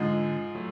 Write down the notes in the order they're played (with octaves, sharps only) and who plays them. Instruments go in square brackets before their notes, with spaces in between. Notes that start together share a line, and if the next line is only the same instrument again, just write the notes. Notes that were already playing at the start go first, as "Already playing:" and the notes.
Already playing: [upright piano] G#2 F3 G#3 [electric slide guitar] D3
[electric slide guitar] F#3 A3